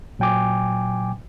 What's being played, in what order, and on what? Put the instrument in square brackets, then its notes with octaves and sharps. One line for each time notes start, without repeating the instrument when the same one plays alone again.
[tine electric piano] A#2 F#3 G5 G#5 D6